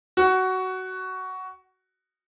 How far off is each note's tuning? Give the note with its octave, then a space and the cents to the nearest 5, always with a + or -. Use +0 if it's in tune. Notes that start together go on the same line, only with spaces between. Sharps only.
F#4 +15